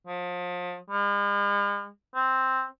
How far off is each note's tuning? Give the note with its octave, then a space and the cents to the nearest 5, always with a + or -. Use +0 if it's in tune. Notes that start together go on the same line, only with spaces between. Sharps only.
F3 +35
G#3 -45
C4 +0